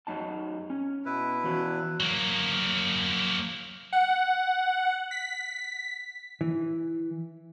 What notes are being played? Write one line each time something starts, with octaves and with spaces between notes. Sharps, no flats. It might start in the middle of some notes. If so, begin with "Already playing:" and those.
F#2 D#4 A5
C#4
B2 E4 B4
E3 F#4
F#3 A#3
F#5
B6
E3